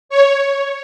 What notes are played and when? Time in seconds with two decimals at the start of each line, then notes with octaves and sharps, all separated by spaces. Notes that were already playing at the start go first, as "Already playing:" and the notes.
0.09 C#5